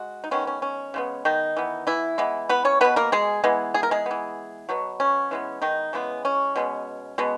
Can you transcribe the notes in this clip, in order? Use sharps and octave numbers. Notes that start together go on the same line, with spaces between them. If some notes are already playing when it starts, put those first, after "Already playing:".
Already playing: G#3 F#4
D#4
D#3 G#3 B3 C#4
C#4
C#4
C#3 G#3 B3
D#3 D#4
E3 B3
E3 E4
E3 G#3 B3
B3 B4
C#4 C#5
B2 A#3 B3 B4
A#3 A#4
G#3 G#4
E3 G#3 B3
G#4
A#4
G#3 G#4
E3 B3
B2 F#3 B3
C#4
E3 G#3 B3
D#3 D#4
C#3 E3 G#3 B3
C#4
B2 G#3 B3
B2 G#3 B3